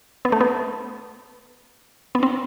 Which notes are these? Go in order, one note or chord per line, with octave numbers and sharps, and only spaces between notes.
B3
A3
B3
B3
C4